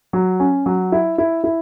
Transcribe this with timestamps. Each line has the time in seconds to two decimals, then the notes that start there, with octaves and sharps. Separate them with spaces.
0.13 F#3
0.40 C#4
0.66 F#3
0.92 E4
1.18 E4
1.44 E4